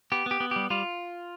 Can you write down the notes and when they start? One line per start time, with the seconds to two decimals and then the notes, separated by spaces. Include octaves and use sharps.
0.12 B3 G4
0.26 B3 G4
0.40 B3
0.51 G3 G4
0.70 G3 F4